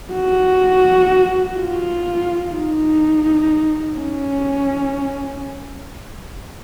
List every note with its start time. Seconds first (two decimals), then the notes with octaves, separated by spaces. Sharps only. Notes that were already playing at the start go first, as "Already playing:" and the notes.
0.13 F#4
1.58 F4
2.54 D#4
3.98 C#4